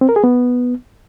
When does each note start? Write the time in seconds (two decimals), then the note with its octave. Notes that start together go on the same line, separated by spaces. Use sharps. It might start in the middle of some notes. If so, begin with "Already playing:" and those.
0.01 C4
0.09 A#4
0.16 G#4
0.24 B3